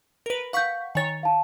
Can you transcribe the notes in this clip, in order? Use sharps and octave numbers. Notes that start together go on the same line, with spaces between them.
A#4 B4
F5 F#5 C#6 G6 B6
D#3 C#5 G#5 A6
F5 A5